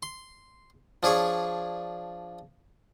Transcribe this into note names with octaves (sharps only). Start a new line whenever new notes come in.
C6
F3 D4 G#4 C#5